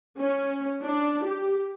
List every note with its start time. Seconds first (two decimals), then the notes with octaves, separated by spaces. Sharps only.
0.19 C#4
0.83 D4
1.25 G4